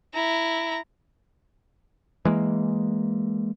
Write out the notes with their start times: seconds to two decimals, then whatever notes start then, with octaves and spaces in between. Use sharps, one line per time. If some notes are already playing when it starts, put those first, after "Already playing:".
0.14 E4 A#5
2.25 E3 G#3 A#3